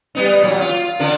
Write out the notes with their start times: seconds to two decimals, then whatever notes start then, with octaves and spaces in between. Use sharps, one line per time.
0.15 G3 B3 D#4
0.42 A#2 F#3
0.61 F4
1.00 D3 D4 A#4